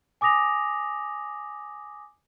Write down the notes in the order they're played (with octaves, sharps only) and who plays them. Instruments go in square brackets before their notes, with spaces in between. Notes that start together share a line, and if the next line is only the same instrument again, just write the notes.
[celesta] G#5 D6 D#6 A#6 F7